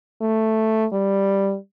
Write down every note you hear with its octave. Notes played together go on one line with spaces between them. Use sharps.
A3
G3